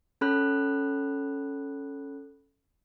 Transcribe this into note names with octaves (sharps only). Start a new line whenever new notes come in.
C#4 A4 B5 F#6